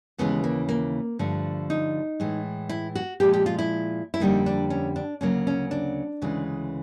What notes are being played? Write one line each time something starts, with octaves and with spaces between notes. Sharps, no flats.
D#2 C#3 E3 G#3 B3
A#3
A#3
G2 D3 F3 A3
D#4
A2 E3 G#3
E4
F#4
A#2 F3 G#3 G4
G4
F4
E4
E4
F2 D3 G3 A#3 D#4
D4
C#4
D4
D2 C#3 F#3 A#3 C#4
C#4
D4
D2 C#3 E3 G#3